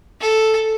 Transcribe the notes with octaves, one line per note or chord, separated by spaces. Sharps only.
A4